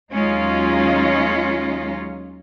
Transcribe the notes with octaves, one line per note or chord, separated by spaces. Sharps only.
D#2 F#3 G#3 C#4 D#4 F4